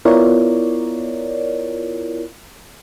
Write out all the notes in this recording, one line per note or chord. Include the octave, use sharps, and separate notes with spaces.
B3 E4 F4 A#4 C#5 D5